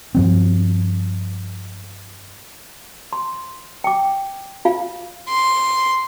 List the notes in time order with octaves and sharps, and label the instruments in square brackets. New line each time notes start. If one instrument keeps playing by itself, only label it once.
[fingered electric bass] G2 F3 C4
[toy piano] C6
G5 D6
F4 F5
[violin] C6